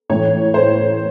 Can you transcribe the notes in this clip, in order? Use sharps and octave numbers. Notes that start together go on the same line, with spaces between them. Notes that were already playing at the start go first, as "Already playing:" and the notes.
A2 E3 C#5
C5